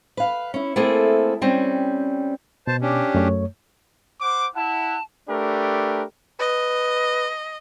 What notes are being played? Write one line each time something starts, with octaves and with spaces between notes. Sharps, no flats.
B4 F5
C#4 E4
A3 A#3 C4 E4 G#4 A4
G3 C4 C#4
B2 C5 A5
C#4 D4 G4
F#2 A3 C#5
C5 F#5 D6
E4 F#5 A5
A3 D4 G4 A#4 B4
B4 D#5